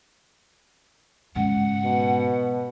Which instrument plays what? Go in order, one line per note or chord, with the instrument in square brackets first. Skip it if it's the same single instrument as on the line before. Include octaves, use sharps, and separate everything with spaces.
[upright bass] G#2 C#3 [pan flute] F#5
[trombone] B2